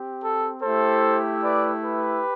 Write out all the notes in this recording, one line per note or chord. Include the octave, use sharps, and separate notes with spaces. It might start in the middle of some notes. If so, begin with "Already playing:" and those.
Already playing: C4 G4
A4
A3 E4 G4 A4 C5
B4 D5
G4 B4